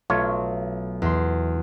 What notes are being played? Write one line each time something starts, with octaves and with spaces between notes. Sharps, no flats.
B1 A3 F4 C#5
E2 C6